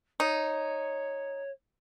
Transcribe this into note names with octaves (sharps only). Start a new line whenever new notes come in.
D#4 C#5